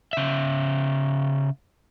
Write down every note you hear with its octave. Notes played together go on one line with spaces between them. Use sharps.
C#3 E5